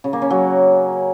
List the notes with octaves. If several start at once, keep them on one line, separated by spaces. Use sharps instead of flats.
C#3
A#3
C#4
F#3